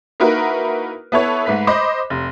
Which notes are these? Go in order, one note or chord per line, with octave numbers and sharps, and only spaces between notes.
A#3 D#4 E4 F#4 A#4 B4
B3 E4 A4 B4 C#5
G#2 A3 B4 B6
C5 D#5 B5 D6
F1